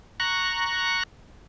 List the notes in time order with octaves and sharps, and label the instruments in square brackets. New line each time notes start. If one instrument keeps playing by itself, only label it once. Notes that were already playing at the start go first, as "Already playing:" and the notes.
[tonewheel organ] A#5 C#6 F#6